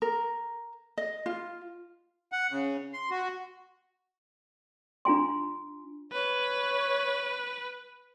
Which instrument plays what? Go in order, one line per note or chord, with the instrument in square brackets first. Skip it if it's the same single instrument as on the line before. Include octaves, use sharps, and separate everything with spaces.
[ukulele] A#4
D#5
F4
[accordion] F#5
C#3
C6
F#4
[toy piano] D4 F4 G#5 C6
[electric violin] B4 [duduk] C#5